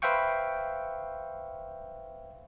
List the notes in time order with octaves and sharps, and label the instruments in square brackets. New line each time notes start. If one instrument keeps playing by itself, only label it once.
[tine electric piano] B4 C5 E5 F5 G5 C#6